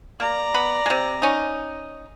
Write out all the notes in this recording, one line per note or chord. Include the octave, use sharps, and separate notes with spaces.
A#3 D5 A#5
B3 B5
C3 G#3
C#4 D#4